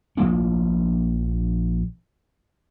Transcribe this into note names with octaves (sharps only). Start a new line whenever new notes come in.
A#1 F3 A#3 C#4